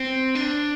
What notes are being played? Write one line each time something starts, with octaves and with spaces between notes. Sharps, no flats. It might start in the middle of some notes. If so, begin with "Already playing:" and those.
Already playing: C4
D4